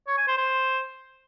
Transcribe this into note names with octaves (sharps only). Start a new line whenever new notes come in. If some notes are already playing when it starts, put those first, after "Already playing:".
C#5
G#5
C5
C5